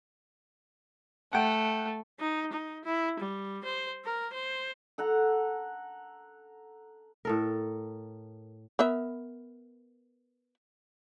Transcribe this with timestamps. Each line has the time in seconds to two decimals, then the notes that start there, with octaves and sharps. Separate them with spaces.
1.33 A3 F#5 G5
2.20 D#4
2.52 D#4
2.84 E4
3.20 G3
3.64 C5
4.05 A#4
4.33 C5
4.98 A4 F#5 A#5
7.25 A2 A4 A#4
8.79 B3 A#4 E5